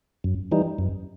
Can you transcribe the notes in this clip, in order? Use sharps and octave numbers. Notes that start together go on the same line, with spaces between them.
F#2
E3 G3 D#4
F#2